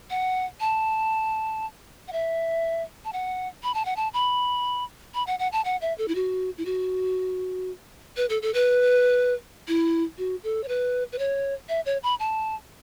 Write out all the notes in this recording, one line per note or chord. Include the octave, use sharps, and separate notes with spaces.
F#5
A5
F#5
E5
A5
F#5
B5
A5
F#5
A5
B5
B5
F#5
F#5
A5
F#5
E5
A4
E4
F#4
E4
F#4
B4
A4
A4
B4
E4
F#4
A4
C#5
B4
B4
C#5
E5
C#5
B5
A5